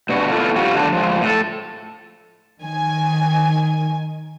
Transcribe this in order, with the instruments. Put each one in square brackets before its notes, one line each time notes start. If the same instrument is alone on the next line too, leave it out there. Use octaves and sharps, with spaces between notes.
[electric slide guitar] G2 B2 F#4
B3 E4 F4 A4 A#4
F3 G3 F4 F#4
E2 D3 F#3 A5
F3 G#3
A2 A4
[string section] D#3 G#5